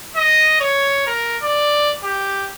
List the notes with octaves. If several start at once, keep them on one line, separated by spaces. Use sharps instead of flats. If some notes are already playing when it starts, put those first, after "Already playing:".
D#5
C#5
A#4
D5
G4